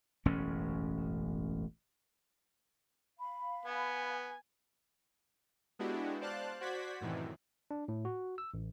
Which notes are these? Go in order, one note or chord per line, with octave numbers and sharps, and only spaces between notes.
E1 A1 F#2 C#4
F5 B5
B3 G#5
G#3 B3 D4 E4 F#4 G4
C5 D5 F5 A5 F#6
F#4 C5 D5 F#5 G#6 B6
F#2 A2 C3 D#3 E3
D4
A2
F#4
E6
A1